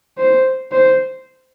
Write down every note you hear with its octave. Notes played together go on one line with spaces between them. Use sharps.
C5
C5